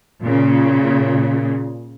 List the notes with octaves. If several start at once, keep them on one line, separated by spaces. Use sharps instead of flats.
A#2 C#3